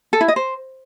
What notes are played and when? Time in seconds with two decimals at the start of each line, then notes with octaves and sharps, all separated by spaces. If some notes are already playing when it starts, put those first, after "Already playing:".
0.13 A4
0.21 E4
0.28 D#5
0.36 C5